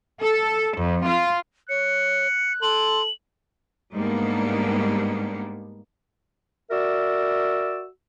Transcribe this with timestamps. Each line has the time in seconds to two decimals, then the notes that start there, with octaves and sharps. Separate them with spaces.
0.21 A4
0.77 F2
1.06 F4
1.69 C#5 F#6 C#7
2.62 A4 C6 F#7
3.93 G#2 G3 A#3 B3 D4
6.71 F#4 A#4 D5 E5 E6